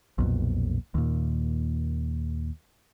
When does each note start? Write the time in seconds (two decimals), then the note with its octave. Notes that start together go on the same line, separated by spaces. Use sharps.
0.18 B1 F2 A#2
0.95 D#2 A#2